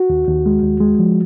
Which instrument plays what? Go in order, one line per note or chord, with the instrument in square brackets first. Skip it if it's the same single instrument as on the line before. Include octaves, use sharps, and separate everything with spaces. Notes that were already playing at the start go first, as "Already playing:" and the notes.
Already playing: [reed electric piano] F#4
D#2
D#2
G#3
D#2
G#3
F3